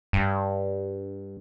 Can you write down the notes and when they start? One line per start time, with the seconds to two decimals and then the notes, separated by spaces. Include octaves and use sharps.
0.13 G2